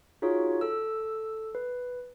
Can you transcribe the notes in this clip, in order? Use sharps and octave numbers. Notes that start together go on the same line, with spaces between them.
D#4 F4 F#4 G#4 C#5
A4 E6
B4